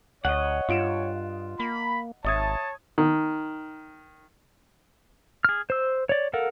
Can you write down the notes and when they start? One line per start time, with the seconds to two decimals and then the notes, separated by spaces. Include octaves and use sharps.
0.25 D2 C#5 D#5 F#5
0.69 G2 F4 D7 E7
1.60 A#3 B5
2.25 G#1 C#5 E5 A5 D#6 G#6
2.98 D#3
5.45 G#4 F6
5.70 C5 E6
6.09 C#5 D5
6.33 A4 A#4 F5 F#5